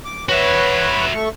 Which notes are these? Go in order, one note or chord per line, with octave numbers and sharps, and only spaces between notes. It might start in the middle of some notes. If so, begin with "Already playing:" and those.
D6
F#4 B4 C#5 E5
A3 C#6